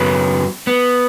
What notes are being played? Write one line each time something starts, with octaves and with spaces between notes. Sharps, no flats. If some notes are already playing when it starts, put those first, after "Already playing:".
Already playing: F#2 C#3 F#3 B3
B3